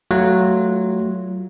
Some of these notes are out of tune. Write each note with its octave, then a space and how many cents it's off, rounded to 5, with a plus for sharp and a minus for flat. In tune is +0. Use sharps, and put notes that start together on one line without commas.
F#3 +15 A3 +0 F4 +0